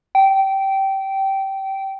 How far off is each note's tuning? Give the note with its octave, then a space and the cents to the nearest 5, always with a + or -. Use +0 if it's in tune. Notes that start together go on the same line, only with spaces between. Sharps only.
G5 -15